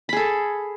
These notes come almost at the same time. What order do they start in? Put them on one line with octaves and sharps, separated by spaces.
B5 G#4 A4